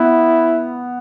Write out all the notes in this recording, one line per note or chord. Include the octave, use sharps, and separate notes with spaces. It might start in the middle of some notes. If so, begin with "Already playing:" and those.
Already playing: B3 E4